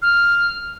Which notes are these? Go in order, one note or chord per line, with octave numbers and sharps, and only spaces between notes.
F6